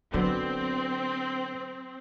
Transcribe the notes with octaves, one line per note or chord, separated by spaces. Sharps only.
D3 F#3 B3 C4